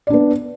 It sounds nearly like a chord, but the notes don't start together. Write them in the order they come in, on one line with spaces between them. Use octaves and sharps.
D5 D4 B3